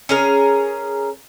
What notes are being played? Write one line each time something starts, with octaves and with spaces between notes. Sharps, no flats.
C#4 G#4 A#4